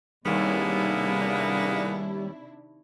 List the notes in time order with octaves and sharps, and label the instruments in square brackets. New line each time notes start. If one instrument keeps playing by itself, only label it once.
[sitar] D#2 [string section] C3 D4 E4 [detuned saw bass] G3 [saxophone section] G#3 A#3 B3